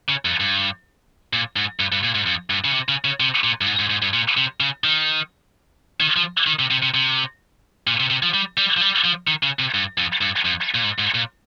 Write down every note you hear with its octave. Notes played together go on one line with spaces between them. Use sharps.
C#3
F2
G2
A#2
G#2
G2
G2
A#2
G#2
F2
G2
C#3
C3
C#3
C#3
C3
A#2
G2
G#2
G#2
G#2
G2
A#2
C3
C#3
D#3
D#3
F3
D#3
C3
C3
C3
C3
A#2
C3
C3
F3
G3
G3
F3
G3
F3
D#3
C#3
C3
G2
F2
G2
F2
A#2
G#2
G#2
A#2